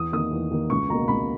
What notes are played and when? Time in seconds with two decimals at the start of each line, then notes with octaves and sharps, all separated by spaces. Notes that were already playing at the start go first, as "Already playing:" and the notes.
Already playing: E2 D#6
0.12 D#3 A#3 D#6
0.31 E2
0.51 D#3 A#3
0.70 C#2 C#6
0.89 B2 A#3 A#5
1.08 C#2 B5